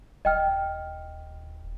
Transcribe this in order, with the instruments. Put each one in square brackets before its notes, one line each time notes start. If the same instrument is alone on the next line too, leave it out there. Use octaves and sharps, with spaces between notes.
[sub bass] D#1 [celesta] D#5 G5 F6